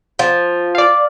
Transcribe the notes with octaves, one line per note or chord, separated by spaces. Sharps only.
F3
D5 F5